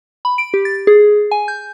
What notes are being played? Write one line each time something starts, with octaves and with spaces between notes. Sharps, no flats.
B5
D7
G4
A6
G#4
G#5
G6